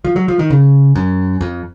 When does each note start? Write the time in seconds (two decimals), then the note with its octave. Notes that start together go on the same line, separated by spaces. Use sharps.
0.04 F3
0.16 F#3
0.28 F3
0.39 D#3
0.50 C#3
0.95 F#2
1.41 F2